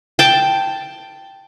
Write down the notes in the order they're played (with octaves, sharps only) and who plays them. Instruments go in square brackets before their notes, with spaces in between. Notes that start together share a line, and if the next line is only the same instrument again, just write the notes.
[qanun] G5 A5